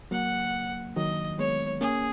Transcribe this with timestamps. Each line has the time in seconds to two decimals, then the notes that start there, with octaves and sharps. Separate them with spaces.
0.11 F#3 A#3 F#5
0.96 D#3 F#3 D#5
1.38 G#3 B3 C#5
1.81 A#3 C#4 G#4